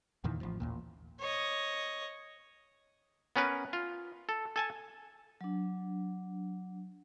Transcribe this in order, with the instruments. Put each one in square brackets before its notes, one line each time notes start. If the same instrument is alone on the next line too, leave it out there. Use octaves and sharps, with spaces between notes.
[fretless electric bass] E2 A#2 D#3 E3
A1 F3
A1 D#2 A#2
[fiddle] C#5 D#5
[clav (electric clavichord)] B3 C#4 A#4 B4
F4
A4
A4 G#5 A5
[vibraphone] F#3 D4